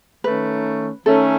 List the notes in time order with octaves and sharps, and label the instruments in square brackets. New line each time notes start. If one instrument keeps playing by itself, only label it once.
[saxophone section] D#3 A3 C#4 [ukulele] B4
[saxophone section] D#3 A3 C#4 [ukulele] A4